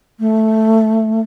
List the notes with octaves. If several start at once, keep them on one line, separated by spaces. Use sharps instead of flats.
A3